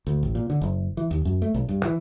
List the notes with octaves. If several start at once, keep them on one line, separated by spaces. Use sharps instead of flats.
D2
A1
A#2
D3
F#1
E3
D#2
F#2
A3
B1
G2
E3